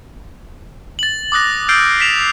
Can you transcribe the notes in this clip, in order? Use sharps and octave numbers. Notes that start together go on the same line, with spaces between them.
A6 F#7
D6 D#6 F#6 A#6 F#7
E6 F6 G6 A6 C7 D7
B6 C7 E7 F7